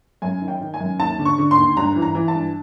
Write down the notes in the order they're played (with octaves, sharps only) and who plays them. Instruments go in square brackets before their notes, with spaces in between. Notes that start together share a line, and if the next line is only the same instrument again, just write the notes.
[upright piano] F#2 G#5
D#3
G5
D#3
G#5
F#2
D#2 A5
D3
C#6
D3
C6
D#2
G2 A#5
E3
A#5
E3
A5
G2